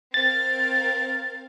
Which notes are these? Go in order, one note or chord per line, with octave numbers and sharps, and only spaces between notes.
C4 A#4 F5 A6